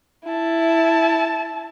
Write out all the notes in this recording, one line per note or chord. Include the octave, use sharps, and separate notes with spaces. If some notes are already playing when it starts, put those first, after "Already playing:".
E4 A5